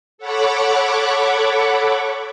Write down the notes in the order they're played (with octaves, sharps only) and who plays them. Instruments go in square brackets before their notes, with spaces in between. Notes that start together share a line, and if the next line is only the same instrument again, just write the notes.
[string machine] A4 C#5 F#5 B5 C#6 D6